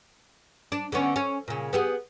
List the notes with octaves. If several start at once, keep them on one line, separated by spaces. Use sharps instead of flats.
D4
D3 B3 C#4
C#4
A#2 C#3
B3 G4 G#4